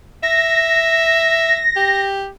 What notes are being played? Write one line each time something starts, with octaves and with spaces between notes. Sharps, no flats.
E5 A#6
G4